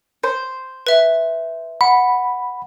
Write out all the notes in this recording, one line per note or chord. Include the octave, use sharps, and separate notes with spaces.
C5
B4 E5
F#5 B5